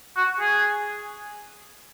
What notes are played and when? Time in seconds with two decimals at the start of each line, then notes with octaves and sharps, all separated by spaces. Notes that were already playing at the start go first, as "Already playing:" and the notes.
0.17 F#4
0.40 G#4